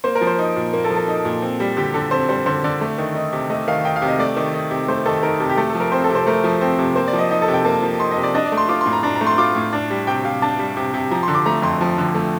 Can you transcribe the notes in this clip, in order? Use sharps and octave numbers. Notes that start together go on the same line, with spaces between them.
A#3 C5
A#4
F3
C5
D#4
A#2
A#3
A4
F3
A4
D#4
A#2
C4
G3
D3 G4
D3 A4
C4 C5
G3 C5
D3 C5
D3 D5
A3
D#3
D#4
C3
A3 D#5
D#3 F5
D#4 G5
F5
C3
D#5
A3 D5
D#3
D#4
C3
A3 C5
D#3 A4
D#4 A#4
C3 A4
G4
A3 A4
A4
F3
A#4
C4 C5
A4
C3
C5
A3 A#4
F3
C4
C3
A#3 C5
D5
F3
D#5
D#4 D#5
A4
C3
G5
A#3 A5
F3
D#4 C6
D#5
C3
D5
D4 D#5
D5
A3
C6
F4 D6
A2 C6
A#5
D4 A#5
A#5
A3
C6
F4 D6
A2
D4
G3
C3 G5
C3 F5
D4 A5
G3
C3
C3
F3 A#5
D3 C6
D6
A3 A#5
F2 C6
F3
D3
A3